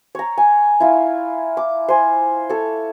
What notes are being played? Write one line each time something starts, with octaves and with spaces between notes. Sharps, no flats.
C#5 A#5
G#5
E4 F4
D6
C5 G#5
A4 C#5